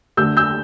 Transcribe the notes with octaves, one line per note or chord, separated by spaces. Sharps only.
D2 D3 A3 E6 G6
E6 G6